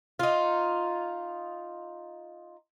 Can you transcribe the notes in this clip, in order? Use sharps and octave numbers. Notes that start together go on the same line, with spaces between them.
D#4 F4